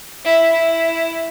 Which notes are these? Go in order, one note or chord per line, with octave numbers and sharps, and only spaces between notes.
E4
E4